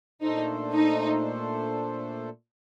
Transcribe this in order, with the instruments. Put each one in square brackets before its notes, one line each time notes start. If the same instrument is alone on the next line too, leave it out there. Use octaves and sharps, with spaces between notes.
[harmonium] A#2 A3 D4 A4 C5 [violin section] D#4
[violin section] D#4